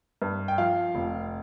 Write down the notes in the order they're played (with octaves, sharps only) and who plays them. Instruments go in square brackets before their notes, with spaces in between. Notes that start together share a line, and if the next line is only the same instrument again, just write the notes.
[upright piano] G2
G5
F3 F5
F1